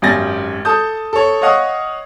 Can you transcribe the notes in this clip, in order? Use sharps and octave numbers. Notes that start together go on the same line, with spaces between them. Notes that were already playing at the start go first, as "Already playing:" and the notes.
G#1 F#2 G4 G#5 A6 A#6
A4 A5 D#6 G6
A4 C#5
C#5 D#5 F5 F#5 C#6 D#6